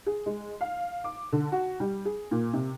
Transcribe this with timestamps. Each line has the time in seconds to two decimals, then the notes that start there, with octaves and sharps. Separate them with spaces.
0.06 G#4
0.26 G#3
0.61 F5
1.04 D6
1.32 D3
1.52 F#4
1.80 G3
2.05 G#4
2.31 A#2
2.53 C3